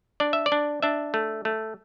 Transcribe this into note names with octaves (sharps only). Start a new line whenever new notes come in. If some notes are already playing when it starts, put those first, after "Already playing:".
D4 D5
E5
D5
D4
D4 E5
A3
A3